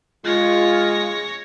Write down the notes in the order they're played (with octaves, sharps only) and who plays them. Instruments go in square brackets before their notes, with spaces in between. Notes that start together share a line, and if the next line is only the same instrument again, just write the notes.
[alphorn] G#3 [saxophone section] F4 [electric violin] C#5 A#6